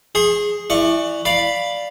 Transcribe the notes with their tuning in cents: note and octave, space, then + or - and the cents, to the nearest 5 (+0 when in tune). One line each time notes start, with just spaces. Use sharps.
G#4 +0 C5 +45
E3 +5 D5 +25 C#6 +0
D5 +0 F5 +0 B5 +0